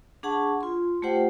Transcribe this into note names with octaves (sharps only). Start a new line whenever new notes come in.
D4 G#4 F#5 A5 C#6
F4 C6
A3 F4 G4 C5 F#5 G5